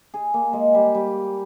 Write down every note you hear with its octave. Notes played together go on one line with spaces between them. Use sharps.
G#4
A#3
G#3
G3
G3